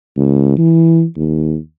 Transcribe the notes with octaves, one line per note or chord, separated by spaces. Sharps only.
C#2
E3
D#2